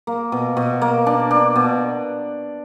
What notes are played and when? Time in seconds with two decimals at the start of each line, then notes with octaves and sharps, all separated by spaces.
0.07 A#3
0.32 B2
0.57 B2
0.82 A#3
1.06 D4
1.31 D4
1.56 B2